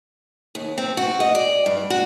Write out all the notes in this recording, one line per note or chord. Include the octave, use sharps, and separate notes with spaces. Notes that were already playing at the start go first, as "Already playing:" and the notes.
D#2
C4
F#4
D#5
D5
G2
F#4